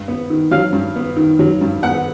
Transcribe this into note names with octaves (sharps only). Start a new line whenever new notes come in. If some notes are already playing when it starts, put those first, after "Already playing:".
Already playing: G2
B3
D#3
F#3 F5
G2
B3
D#3
F#3
G2
B3 F#5